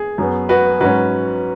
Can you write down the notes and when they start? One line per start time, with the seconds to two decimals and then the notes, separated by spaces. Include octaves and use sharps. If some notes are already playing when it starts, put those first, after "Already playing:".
Already playing: G#4
0.18 F#2 F#3 B3
0.49 F#4 B4
0.80 G#2 F#3 C#4 F#4 B4